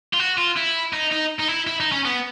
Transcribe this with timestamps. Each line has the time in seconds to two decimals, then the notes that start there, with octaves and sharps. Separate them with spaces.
0.14 F4
0.20 F#4
0.38 F4
0.57 E4
0.94 D#4
1.12 D#4
1.40 D#4
1.49 E4
1.67 E4
1.80 D#4
1.92 C#4
2.05 B3